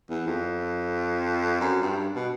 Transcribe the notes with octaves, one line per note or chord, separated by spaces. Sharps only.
E2
F2
F#2
G2
B2